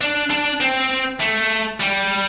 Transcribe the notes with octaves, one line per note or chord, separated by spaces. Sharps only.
D4
D4
C4
A3
G3